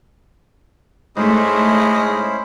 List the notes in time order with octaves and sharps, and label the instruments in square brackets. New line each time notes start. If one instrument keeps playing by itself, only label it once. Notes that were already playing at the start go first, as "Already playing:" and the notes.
[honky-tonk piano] G#2 [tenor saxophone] G#3 [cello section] A3 [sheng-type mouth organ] C#4 E4 C5